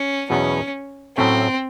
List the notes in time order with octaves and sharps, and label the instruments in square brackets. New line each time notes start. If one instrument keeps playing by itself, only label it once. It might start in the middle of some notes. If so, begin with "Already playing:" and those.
Already playing: [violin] C#4
[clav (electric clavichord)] E2 B2 F#3 B3 [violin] C#4
[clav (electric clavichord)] A2 F#3 A3 C#4 [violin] C4